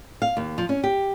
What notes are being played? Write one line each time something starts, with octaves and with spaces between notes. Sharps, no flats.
F5
D#2
F3
C#4
G4